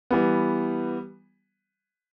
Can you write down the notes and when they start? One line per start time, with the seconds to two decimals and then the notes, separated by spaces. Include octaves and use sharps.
0.11 E3 G3 B3